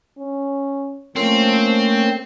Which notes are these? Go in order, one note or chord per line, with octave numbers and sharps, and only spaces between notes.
C#4
F3 A3 A#3 C4 C#4